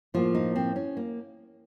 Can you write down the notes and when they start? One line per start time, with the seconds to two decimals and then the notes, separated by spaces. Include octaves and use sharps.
0.14 A2 F3 A#3 F4
0.35 D#4
0.56 C4
0.76 C#4
0.97 A#3